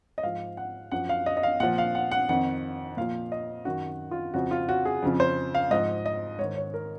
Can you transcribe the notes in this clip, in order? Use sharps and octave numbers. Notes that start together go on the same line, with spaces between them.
D#5
G#2 F3 F5
F#5
F#2 F3 F#5
F5
D#5
D#5
F5
A#2 F3 F#5
F5
F#5
F#5
F2 D#3 F#5
A#2 F3 F5
D#5
F#2 D#3 F#4
F4
F2 C#3 F3 F#4
F4
F#4
G#4
F2 C#3 F3
C5
F5
G#2 F3 D#5
D#5
G#2 C#5
D#3
C#5
A#4